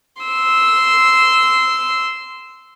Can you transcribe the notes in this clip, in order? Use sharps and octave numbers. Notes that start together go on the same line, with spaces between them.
C6 E6